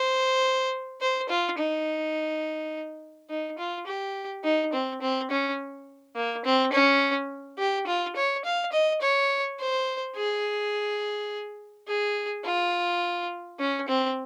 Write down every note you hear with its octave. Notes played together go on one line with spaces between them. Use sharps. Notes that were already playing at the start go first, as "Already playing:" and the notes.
Already playing: C5
C5
F4
D#4
D#4
F4
G4
D#4
C4
C4
C#4
A#3
C4
C#4
G4
F4
C#5
F5
D#5
C#5
C5
G#4
G#4
F4
C#4
C4